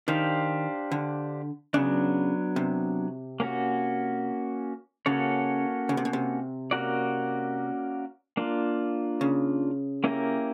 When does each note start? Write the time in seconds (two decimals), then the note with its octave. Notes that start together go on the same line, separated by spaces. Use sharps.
0.08 D#3 D4 G4 C5 F5
0.92 D3
1.74 C#3 F#3 B3 D4
2.56 C3
3.40 A#3 C#4 F#4
5.06 C#3 A#3 C#4 F#4 A4 C#5
5.89 C#3
5.97 C3
6.05 B2
6.13 C3
6.71 A#3 C#4 F#4 A#4 D5
8.37 A#3 D4 F4
9.21 C#3
10.04 A#3 C#4 E4 G4 A#4